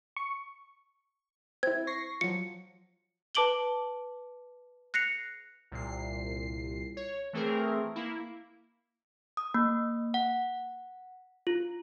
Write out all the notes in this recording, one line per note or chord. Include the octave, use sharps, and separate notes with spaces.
C#6
C4 E4 G#6
C#6 A#6 C7
F3 F#3 C#7
B4 A5 D6 D7 F#7 G7
F#6 A#6 C7 C#7 F7
C2 A#2 C7
C#5
E3 A3 C4 G#4 A#4
A#3 E4
D#6
A#3
F#5
F4